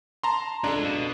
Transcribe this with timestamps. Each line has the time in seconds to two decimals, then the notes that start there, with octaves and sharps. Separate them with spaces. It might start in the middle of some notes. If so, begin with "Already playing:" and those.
0.23 A5 A#5 C6
0.64 G#3 D4 F4 A4
0.84 B2